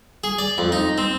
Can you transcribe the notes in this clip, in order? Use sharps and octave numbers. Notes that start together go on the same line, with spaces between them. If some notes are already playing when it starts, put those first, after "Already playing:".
G#4
D5
F2
D#4
C4